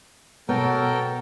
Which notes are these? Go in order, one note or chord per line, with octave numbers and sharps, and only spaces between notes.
B2 F#3 B3 A4 A#4 G5